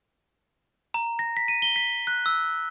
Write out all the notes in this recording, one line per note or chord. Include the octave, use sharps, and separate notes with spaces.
A#5
A#6
B6
D#7
G7
B6
F#6
E6